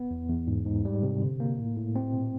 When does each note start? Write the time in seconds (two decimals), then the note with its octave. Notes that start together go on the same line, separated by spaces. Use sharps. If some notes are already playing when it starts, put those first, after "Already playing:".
Already playing: B3
0.11 E2
0.29 E2
0.47 G#2
0.66 G#2
0.85 G3
1.03 C3
1.22 D3
1.40 A#3
1.58 A2
1.77 A2
1.96 C4
2.14 A#2